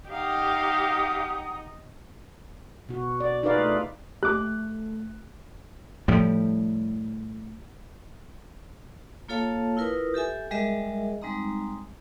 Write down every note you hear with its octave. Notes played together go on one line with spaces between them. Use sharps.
D#4 G4 F5 F#5 A#5 D#6
B2 F#4
D5
D#4 F4 G#4 B4 D5 F5
A3
A3 G4 D6 F#6
A2 F3 G3
A#3 F4 A4 C#5 F5 A5
E4 F4 A#4 B4 D#6
G4 A4 E5 G#5
G3 G#3 G#4 A#4 D#5 E5
G3 G#3 C4 D#4 A#5